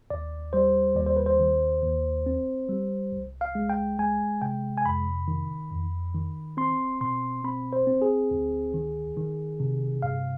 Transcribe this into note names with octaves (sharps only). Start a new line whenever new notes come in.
D#2 D5
G3 C5
D#2 D5
C5
B4
C5
D#3
D#2
C4
G3
C2
F5
G#3
G5
G#3 G#5
C3 G5
G#5
F2 B5
D#3
F2
D#3
C4 C6
B2 C6
C4 B5
C5
C4
G#4
D2
D#3
D#3
C3
G2 F5